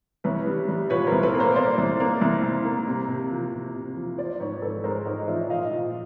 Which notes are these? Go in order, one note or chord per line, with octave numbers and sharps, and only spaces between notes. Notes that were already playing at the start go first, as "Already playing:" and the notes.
C2 B4 C#5
G3
G3
A#2 B4 C#5
A#4 C5
C2
A4 B4
A#3
A#4 C5
A#3 C5 D5
C2
A#3
C2
C2
A#3
C3
C3
F3
C3
C3
F3
F3 C5 D5
G#2 B4 C#5
G#2 A4 B4
G#3 A#4 C5
G#2 C#5 D#5
F3 D5 E5
A#2 D#5 F5
A#2